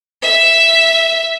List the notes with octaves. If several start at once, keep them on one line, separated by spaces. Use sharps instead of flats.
E5